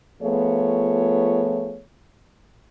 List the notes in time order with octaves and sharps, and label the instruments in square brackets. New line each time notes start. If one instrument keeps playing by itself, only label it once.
[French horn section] F3 A3 B3 F4 G#4 C#5